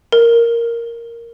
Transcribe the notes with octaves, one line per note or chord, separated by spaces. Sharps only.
A#4